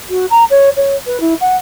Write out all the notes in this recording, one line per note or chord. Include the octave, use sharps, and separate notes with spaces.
F#4
A#5
C#5
C#5
B4
E4
F#5